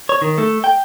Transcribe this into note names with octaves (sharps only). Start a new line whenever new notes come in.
C#5
D#3
A3
G5